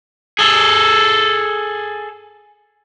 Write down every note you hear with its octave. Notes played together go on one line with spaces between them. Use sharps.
G#4 A4